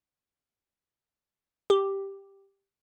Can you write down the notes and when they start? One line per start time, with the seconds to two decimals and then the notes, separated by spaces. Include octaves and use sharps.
1.70 G4